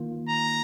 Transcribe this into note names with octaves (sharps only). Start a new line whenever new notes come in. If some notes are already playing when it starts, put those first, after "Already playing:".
Already playing: D#3 A#3 F4
A#5